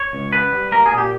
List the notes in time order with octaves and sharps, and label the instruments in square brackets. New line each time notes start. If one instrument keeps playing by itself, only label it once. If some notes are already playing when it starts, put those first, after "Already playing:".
Already playing: [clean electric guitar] C#5
C#2
B3 B4
G3
A#3 A#4
G#4
A#2
G4